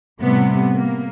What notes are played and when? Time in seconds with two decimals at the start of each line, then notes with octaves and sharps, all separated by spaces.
0.20 A2 C3 G3 B3
0.73 A#3